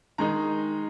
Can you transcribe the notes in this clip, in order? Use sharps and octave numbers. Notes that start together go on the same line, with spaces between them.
D#3 G#3 D#4 A#5